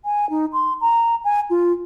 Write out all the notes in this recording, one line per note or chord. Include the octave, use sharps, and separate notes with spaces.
G#5
D#4
C6
A#5
G#5
F4